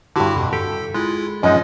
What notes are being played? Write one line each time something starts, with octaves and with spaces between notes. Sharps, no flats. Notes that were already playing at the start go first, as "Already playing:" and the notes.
G2 D3 E4 F#4 G4
F2 B2
G4 A4
G#3 E4 F4
F#2 F3 G#3 C#4 D#4 F4 D#5